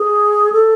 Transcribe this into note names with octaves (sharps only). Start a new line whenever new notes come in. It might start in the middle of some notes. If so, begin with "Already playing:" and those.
Already playing: G#4
A4